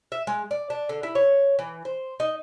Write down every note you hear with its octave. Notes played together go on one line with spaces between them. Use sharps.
E5
G#3
D5
D4
D3
E4
C#5
E3
C5
D#4